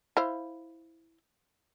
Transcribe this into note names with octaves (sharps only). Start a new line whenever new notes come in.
E4 C5 F5